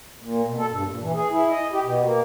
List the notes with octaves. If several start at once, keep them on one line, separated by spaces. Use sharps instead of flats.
A#2
B2
A4
G2
A#2
E3
G#4
E4
D#5
G4
B2
A#3